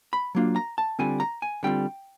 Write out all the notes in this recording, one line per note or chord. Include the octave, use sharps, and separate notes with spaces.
B5
F#3 A#3 D4 F4
A#5
A5
D3 G3 C4 F4 G#5
A#5
G#5
D3 G3 C4 F4 G5